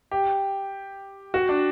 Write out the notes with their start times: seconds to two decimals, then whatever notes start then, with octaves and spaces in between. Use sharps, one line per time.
0.11 G4
1.34 F#4
1.49 D4